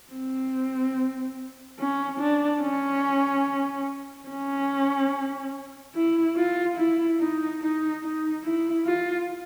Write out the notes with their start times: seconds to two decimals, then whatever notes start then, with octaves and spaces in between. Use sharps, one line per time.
0.12 C4
1.79 C#4
2.20 D4
2.62 C#4
4.29 C#4
5.95 E4
6.37 F4
6.78 E4
7.19 D#4
7.61 D#4
8.03 D#4
8.44 E4
8.86 F4